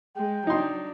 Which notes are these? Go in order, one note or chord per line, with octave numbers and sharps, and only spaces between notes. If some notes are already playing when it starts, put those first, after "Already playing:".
G#3 G5
F#3 D4 D#4 C6